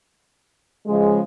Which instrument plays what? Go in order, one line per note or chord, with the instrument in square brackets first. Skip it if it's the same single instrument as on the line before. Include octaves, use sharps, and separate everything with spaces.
[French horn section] C#3 F3 G#3